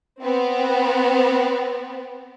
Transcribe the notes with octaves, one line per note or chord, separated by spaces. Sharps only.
B3 C4